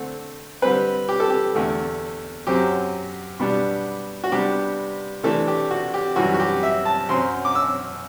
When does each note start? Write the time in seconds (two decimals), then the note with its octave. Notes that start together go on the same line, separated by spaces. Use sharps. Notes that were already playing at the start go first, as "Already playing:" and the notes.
Already playing: D3 A3 C4
0.62 D3 G3 C4 B4
1.09 G4
1.20 A4
1.30 G4
1.55 E2 D3 A3
2.47 F#2 F#3 C4 G4
3.39 B2 G3 B3 D4
4.24 F#4
4.32 C3 G3 B3 D4 G4
5.23 C3 E3 A3 D4 A4
5.48 G4
5.70 F#4
5.94 G4
6.16 F#2 E3 G3 F#4
6.34 F#4
6.40 G4
6.63 E5
6.85 A5
7.09 F#2 F#3 C4 C6
7.45 D6
7.55 E6